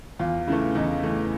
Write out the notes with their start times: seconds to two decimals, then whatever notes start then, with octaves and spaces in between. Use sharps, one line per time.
0.19 E2 F4
0.47 C#3 E3 A3 E4
0.75 E2 D#4
1.03 C#3 E3 A3